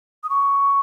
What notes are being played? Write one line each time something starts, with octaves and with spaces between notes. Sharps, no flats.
D#6
C#6